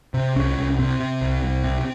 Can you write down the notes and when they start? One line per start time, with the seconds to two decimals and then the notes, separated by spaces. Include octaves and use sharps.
0.14 C3
0.35 C2 C#4
0.57 C2
0.79 C3 C4
1.00 C3
1.21 C2
1.43 C2
1.64 C3